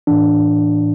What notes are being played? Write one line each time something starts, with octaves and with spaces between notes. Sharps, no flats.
A2 E3 D4